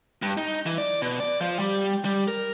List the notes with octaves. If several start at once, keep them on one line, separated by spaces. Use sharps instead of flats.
G2
D#4
E3
D5
B2
D5
F3
G3
G3
A#4